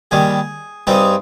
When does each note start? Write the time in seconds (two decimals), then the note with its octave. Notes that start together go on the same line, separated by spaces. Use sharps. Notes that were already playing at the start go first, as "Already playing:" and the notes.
0.11 D#2 D#3 G3 G#4
0.87 G2 G3 C4 D#4 G#4